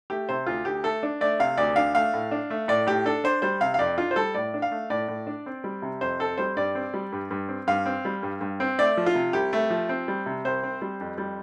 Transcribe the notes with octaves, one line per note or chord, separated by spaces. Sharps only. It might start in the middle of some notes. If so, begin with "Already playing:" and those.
A3 G4
C3 C5
D2 F4
D2 G4
A3 A4
D4
A3 D5
C3 F5
D2 D5
D4 F5
A3 F5
A2
D4
A3
A2 D5
A2 G4
D4 A4
D4 C5
G3 C5
C3 F5
F5
F2 D5
D4 F4
C5
G3 A4
A2 D5
D4
F5
A3
A2 D5
A2
D4
C4
G3
C3
F2 C5
C4 A4
G3 C5
G2 D5
C4
G3
G2
G2
C4
G2 F5
C4
G3
G2
G2
C4
A3 D5
F3
F4
C3
C2 G4
A3
F3
C4
G3
C3
C2 C5
C4
G3
F2
G3